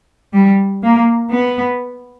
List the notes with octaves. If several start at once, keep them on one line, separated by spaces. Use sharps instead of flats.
G3
A#3
B3